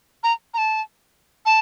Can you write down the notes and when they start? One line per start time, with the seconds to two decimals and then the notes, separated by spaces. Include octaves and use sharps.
0.23 A#5
0.54 A#5
0.58 A5
1.46 A5